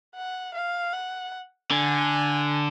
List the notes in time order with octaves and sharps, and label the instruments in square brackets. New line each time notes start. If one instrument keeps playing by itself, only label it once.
[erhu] F#5
F5
F#5
[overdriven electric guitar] D3 [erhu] G#5